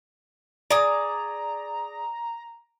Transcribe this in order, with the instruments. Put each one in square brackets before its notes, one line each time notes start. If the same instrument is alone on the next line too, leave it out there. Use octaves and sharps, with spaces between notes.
[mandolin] G#4 D6 [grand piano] D5 [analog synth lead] A#5